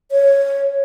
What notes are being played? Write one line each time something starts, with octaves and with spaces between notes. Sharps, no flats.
C#5